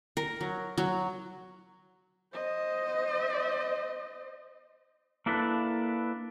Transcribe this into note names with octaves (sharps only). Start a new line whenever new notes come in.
A#4
F#3
F#3
C5 D#5
A#3 D4 E4 A4 B4